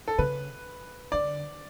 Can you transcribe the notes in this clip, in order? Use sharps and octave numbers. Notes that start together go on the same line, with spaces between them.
A4
C#3 B4
D3 D5